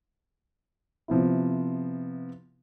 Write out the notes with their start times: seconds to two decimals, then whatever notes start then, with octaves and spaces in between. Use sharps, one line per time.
1.08 C3 F3 B3 E4